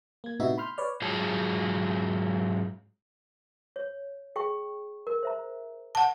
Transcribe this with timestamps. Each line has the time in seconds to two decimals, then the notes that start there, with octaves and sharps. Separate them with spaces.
0.24 A#3 G#6
0.40 A2 C3 B3 D#4 F#4 E5
0.58 B5 C6 F6 G6
0.77 B4 C#5 D5 F6
1.02 G#2 F#3 F4 G#4 A5
3.76 C#5
4.36 G#4 G5 C#6
5.07 A#4
5.23 C5 E5 A#5
5.95 F#5 A5